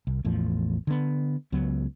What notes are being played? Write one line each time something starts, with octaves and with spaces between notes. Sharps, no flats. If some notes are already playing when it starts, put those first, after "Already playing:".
C2
A1 E2 A2 F3
D3 B3
C#2 F#3 B3